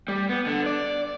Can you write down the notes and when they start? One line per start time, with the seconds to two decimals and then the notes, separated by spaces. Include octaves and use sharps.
0.08 G3
0.29 B3
0.46 D3
0.66 D5